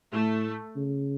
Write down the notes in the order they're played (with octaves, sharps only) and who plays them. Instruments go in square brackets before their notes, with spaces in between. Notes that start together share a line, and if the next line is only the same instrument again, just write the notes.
[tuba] A2 [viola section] A3
[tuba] C#3